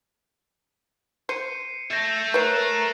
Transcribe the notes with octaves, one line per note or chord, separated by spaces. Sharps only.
C5 C7 C#7 D#7
A4 E5 G6 A6 A#6 D7
A#4 B4 C#5 F#6 C7 D7